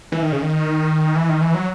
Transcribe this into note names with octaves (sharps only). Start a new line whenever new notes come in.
E3
D#3
C#3
D#3
E3
D#3
E3
F#3